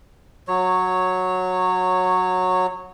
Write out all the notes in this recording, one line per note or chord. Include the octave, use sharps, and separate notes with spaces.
F#3 C#5